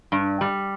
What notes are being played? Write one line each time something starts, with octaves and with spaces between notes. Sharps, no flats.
G2
G3